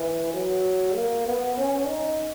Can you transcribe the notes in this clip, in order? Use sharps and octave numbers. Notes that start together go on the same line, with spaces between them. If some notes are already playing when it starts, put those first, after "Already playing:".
Already playing: E3
F#3
A#3
B3
C#4
D#4